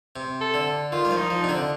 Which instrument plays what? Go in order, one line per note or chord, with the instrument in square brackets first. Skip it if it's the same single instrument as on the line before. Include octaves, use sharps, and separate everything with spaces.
[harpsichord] C3
[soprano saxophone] A4
[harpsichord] D3
[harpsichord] D#3 [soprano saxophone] F4
[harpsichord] G3
F3
[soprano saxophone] D#4
[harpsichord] F3
[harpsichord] C3 [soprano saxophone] D4
[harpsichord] D3